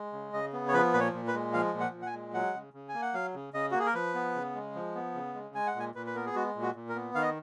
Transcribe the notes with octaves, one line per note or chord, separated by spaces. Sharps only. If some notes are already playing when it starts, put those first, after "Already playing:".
Already playing: G#3
C#3
C#3 D#5
B3
C#5
F3 B4
A#2 B4
C#5
A#2
B4
G#3
F3 F5
A#2
F#5
A#2
F#5
G#5
G#3
F#3 F#5
C#3
C#3
G#5
A#3
F#5
F#3 F5
C#3
C#3 D#5
A#3 F#4
G#4
A#4
F3 B4
B3
C#3
G#3
F3
B3
C#3
G#3
G#3 G#5
F#5
A#2
G#5
A#2 B4
B4
B3 A#4
G#4
G#3 F#4
A#2
F#4
A#2
A#4
B3
D#3 F5
D#5